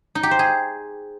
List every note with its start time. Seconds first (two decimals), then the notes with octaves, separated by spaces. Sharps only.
0.15 D#4
0.23 G4
0.31 C5
0.39 G#4